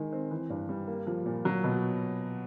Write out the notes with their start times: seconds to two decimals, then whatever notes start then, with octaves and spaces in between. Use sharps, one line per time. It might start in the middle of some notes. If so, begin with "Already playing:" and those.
Already playing: D#3 G#3
0.13 C4
0.31 E3
0.50 G2
0.69 G3
0.87 A#3
1.07 F3
1.26 A#2
1.45 F#3
1.64 B2